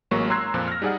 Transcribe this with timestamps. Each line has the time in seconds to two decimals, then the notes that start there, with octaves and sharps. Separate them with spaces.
0.11 A1 F#3 G#3 A#3 C#6
0.30 A#5 C6 E6 F#6 G#6 C7
0.54 F2 A#2 F3
0.68 F6 A#6
0.82 G3 D#4 G#4 D5 F#5